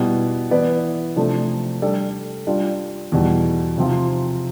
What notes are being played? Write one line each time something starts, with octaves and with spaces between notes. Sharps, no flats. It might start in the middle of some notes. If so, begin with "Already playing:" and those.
Already playing: B2 G3 B3 E4
E3 B3 E4 B4 D5
C3 F3 A3 D4
G3 D4 A4 D5
G3 D4 F4
E2 B2 G3
C3 F3 C4 F4